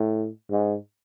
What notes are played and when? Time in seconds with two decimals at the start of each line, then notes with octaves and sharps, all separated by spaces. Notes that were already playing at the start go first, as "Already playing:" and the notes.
Already playing: A2
0.51 G#2